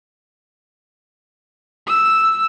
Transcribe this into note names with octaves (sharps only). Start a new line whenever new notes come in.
E6